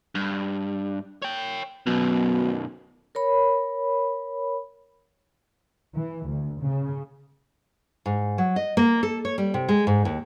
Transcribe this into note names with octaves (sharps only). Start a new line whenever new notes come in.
G2
C#5 G5
B1 F#2 B2
A#4 C#5 B5
E3
D2
C#3
G#2
F#3
D#5
A#3
A4
C#5
G3
C3
G#3
G#2
D#2